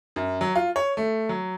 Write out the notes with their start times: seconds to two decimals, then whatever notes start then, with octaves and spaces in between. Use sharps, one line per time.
0.16 F#2
0.41 F#3
0.55 F4
0.76 C#5
0.97 A3
1.29 F#3